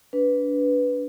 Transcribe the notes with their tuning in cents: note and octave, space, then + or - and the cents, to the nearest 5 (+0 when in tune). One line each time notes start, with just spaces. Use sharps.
D4 -30 B4 +0